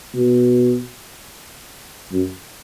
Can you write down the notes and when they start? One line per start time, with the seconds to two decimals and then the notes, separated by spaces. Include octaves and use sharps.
0.14 B2
2.12 F#2